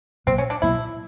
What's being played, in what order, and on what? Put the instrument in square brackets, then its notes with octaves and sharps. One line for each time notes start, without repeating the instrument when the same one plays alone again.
[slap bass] B1 A#2 F#3 B3 [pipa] C4
[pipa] C#4
D4
[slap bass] B1 A#2 F#3 B3 [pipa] E4